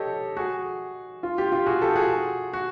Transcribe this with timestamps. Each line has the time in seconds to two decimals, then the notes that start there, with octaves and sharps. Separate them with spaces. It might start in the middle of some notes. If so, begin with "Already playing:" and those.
Already playing: G4 A4 C#5 D#5
0.37 F#4 G#4
1.23 F4
1.38 F4 G4
1.52 F4 G4
1.67 F#4 G#4
1.82 G4 A4
1.96 F#4 G#4
2.53 F#4